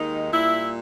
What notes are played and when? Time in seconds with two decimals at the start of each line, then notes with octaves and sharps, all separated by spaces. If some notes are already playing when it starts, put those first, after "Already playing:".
Already playing: D#2 D#3 G#3 D#4
0.32 A#2 G3 E4